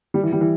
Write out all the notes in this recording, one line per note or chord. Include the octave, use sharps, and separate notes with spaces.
G3
E3
G3
E3